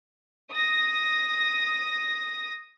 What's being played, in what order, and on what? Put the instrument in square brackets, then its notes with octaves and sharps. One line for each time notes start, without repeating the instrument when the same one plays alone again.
[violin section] D#6 A#6